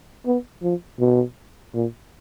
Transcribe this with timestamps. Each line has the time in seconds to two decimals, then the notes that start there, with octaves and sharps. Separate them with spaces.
0.26 B3
0.62 F3
1.00 B2
1.74 A#2